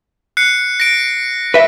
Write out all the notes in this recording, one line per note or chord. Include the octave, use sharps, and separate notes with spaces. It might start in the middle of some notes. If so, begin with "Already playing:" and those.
F#6 C7 C#7
A#6 D7
B4 E5